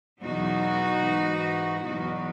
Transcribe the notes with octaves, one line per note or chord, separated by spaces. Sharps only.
E2 B2 F#3 D#4 F#4
G#2 E3
E2 B2 F#3 D#4 F#4